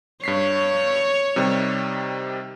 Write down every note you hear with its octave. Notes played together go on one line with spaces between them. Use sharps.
G2 C#5 B6 C7
C3 D#3 G3